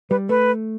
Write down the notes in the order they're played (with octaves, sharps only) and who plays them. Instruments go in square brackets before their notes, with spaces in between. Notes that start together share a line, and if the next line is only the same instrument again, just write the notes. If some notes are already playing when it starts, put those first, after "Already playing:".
[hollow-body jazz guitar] G3 [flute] B4
[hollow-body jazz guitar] A3 [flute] B4